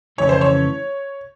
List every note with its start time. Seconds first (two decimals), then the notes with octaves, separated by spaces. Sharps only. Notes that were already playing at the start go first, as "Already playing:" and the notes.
0.18 F2 C#3 E3 A3 C#4 C#5
0.29 C5
0.41 C#5